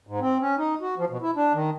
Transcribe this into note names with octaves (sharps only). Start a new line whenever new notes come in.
G#2
C4
C#4
D#4
F#4
F3
B2
E4
D4
D#3